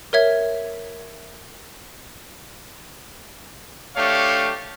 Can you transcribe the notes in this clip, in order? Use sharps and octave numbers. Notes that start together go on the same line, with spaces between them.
A#4 C#5 E5 G#6
A3 D4 G4 C#5 F5